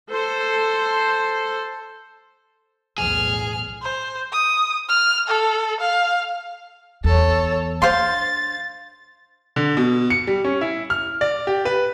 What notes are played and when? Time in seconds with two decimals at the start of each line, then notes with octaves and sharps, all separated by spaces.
0.11 A4 C5
2.98 B1 E2 A2 G#4 F6
3.82 C5
4.32 D#6
4.89 F6
5.28 A4
5.80 F5
7.04 E2 A4 C#5
7.82 D4 C5 F5 C6 A6
9.56 D3
9.77 B2
10.10 C#7
10.27 G3
10.45 C#4
10.61 E4
10.90 F6
11.21 D5
11.47 G4
11.65 B4